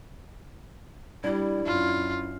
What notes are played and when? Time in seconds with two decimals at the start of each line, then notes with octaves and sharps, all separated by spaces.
1.24 G3 D4 E4
1.66 F#2 F4